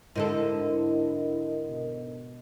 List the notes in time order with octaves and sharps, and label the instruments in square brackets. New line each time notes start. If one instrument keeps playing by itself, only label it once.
[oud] G#2 D3 A4 [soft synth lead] E4 [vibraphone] A#4 D#5
[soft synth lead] B2